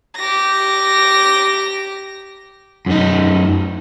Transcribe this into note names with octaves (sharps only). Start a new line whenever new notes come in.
G4 A#6
F#2 D#4